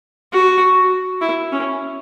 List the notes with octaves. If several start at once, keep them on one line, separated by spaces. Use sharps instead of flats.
F#4
E4
C#4